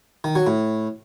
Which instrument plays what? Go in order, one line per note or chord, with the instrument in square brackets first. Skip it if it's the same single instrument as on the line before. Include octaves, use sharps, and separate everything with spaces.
[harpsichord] D#3
F#3
A2